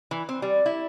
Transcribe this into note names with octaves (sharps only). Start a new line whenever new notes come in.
E3
C4
G3
E4